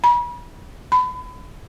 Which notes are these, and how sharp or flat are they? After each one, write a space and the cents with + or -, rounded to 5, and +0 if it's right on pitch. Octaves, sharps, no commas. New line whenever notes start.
B5 -40
B5 +30